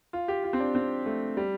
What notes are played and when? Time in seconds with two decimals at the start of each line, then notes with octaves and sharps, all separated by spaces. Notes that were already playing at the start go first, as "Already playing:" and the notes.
0.13 F4
0.28 G4
0.44 F4
0.53 C4
0.60 D4
0.75 C4
1.06 A3
1.37 G3